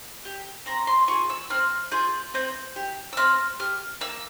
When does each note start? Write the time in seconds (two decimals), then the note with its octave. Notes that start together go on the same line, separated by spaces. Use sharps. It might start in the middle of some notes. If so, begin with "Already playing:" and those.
0.25 G4
0.66 C4 A#5
0.87 C6
1.08 F4 G#4 C#6
1.30 E6
1.50 C4 F6
1.92 F4 G#4 G6
2.34 C4 G6
2.76 G4
3.13 E6
3.17 C4 F6
3.60 G4 F6
4.01 A#3 E6